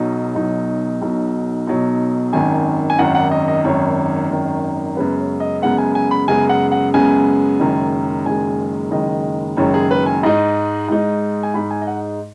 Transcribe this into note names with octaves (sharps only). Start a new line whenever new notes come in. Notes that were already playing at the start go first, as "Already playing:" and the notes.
Already playing: B1 B2 F#3 D#4
B1 B2 F#3 D#4
B1 B2 F#3 D#4
B1 B2 F#3 D#4
G#1 F#2 D#3 G#5
G#5
G#1 F#2 D#3 F#5
F#5
D#5
D#5
G#1 F#2 D#3 C#5
G#1 F#2 D#3
F#2 C#3 G#3 B3 B4
C#5
D#5
F#2 C#3 G#3 B3 F#5
G#5
G#5
B5
F#2 C#3 G#3 B3 G#5
F#5
F#5
F#2 C#3 G#3 B3 G#5
F#1 F#2 D#3 G#3
F#1 F#2 D#3 G#3 G#5
F#1 F#2 D#3 G#3 D#5
F#1 F#2 D#3 G#3 C#5
G#4
B4
G#5
G#2 G#3 D#4 D#5
G#2 G#3 D#4
G#5
G#2 G#3 D#4 B5
G#5
D#5
F#5